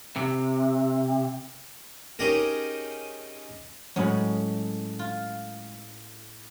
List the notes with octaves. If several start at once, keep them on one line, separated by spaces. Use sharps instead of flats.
C3
C#4 D#4 G4 G#4 A#4
A2 F#3 G#3 C#4 B5
F4